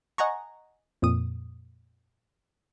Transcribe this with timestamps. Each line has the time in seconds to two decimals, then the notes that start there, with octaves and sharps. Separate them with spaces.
0.18 D#5 F#5 G#5 A#5 C#6
1.02 F2 A#2 D#6